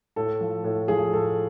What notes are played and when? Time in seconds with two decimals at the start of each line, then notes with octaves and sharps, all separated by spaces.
0.16 A2 A4
0.41 F3
0.64 A2
0.88 F3 G#4
1.13 A2 A4